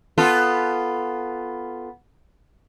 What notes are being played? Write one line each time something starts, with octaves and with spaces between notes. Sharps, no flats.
B3 F4 A4